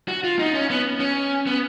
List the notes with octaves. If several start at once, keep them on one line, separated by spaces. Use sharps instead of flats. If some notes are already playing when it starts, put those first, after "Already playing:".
F#4
F4
D#4
C#4
B3
C#4
B3